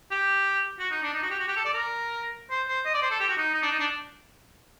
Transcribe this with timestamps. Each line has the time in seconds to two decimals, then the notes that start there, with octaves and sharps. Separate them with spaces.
0.11 G4
0.79 F#4
0.91 D#4
1.02 D4
1.14 D#4
1.22 F#4
1.30 G4
1.39 F#4
1.48 G4
1.56 A4
1.65 D5
1.74 A#4
2.50 C5
2.68 C5
2.85 D#5
2.94 D5
3.02 C5
3.11 A4
3.20 G4
3.29 F#4
3.37 D#4
3.54 D#4
3.62 D4
3.71 D#4
3.79 D4